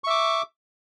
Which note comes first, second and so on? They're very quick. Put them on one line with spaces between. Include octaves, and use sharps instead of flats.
C#6 E5 D6